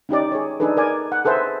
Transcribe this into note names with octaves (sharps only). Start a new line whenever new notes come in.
C#4 D#4 G4 D5
G#4 C#5
D4 D#4 G#4 A4 B4
A#4 D5 G#5
F#5
G#4 A4 B4 C5 E5